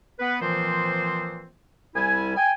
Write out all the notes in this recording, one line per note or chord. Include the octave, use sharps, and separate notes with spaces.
B3 B4
A#2 E3 F3 C4 C5
C2 G3 E4 G#5
G5 G#5